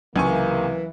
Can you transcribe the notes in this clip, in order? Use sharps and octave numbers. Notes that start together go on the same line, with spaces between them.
C#2 C3 E3 F#3 A#3 C#4 G#5 C#6